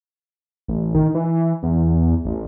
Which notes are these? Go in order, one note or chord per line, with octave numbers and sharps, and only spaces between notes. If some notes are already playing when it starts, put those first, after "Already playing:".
A1
D#3
E3
E2
A1